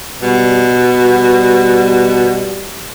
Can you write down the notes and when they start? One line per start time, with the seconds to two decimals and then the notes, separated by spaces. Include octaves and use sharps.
0.22 B2 G3
0.99 G3